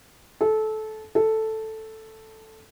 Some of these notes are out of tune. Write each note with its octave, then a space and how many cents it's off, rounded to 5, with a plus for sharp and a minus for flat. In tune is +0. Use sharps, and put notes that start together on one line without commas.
A4 -20
A4 +0